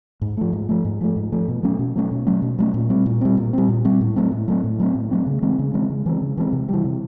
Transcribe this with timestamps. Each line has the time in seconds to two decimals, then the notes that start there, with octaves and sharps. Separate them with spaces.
0.22 G#2
0.37 F3 A3
0.53 G#2
0.69 F3 A3
0.85 G#2
1.01 F3 A3
1.16 G#2
1.32 F3 A3
1.48 B2
1.63 F#3 A3 C#4
1.79 B2
1.96 F#3 A3 C#4
2.11 B2
2.27 F#3 A3 C#4
2.42 B2
2.58 F#3 A3 C#4
2.74 A#2
2.90 G3 C4
3.06 A#2
3.21 G3 C4
3.37 A#2
3.53 G3 C4
3.69 A#2
3.85 G3 C4
4.01 A2
4.16 F#3 A3 C4
4.32 A2
4.48 F#3 A3 C4
4.64 A2
4.80 F#3 A3 C4
4.95 A2
5.11 F#3 A3 C4
5.27 C#3
5.42 E3 G#3 C4
5.59 C#3
5.74 E3 G#3 C4
5.90 C#3
6.06 E3 G#3 C4
6.22 C#3
6.37 E3 G#3 C4
6.53 C3
6.69 E3 G3
6.85 C3